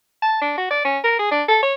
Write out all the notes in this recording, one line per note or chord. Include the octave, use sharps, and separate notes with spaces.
A5
D4
F#4
D5
C#4
A#4
G#4
D4
A4
C#5